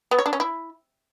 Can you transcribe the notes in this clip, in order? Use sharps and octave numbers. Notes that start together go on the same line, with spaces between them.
B3
C#5
D4
C#4
E4